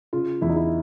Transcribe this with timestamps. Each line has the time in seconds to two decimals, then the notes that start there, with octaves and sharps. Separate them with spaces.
0.13 C#3 F4
0.42 E2 E4
0.49 D#4
0.56 E4